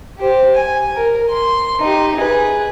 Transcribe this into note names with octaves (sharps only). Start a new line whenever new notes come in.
G4 C5
G#5
A#4
C6
D#4 G4
G#4 B4